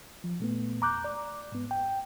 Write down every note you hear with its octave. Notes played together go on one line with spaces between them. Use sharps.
F3
A#2 A3 B3
E2 A#5 D6 F#6 G6
D5
G#2 B3
G5